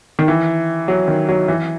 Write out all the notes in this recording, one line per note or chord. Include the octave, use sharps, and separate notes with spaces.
D#3
E3
F#3
D#3
F#3
E3